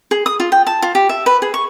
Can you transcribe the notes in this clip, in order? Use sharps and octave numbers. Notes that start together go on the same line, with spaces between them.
G#4
D#6
F4
G5
A5
F4
G4
E5
B4
G#4
C#6